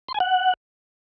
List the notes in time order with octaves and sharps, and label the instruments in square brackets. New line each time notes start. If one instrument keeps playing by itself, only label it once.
[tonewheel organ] C6
G#5
F#5